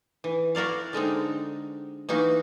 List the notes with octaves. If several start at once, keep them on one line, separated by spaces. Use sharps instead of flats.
E3
E4 F#4 A#4 D5 F5
D3 G#3 C4 D#4
E3 A#3 D#4 F#4